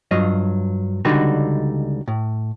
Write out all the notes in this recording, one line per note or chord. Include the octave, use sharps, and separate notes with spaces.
G2 F#3 F4 D#5
C#2 D3 G3 D#4 F#4 B4
A2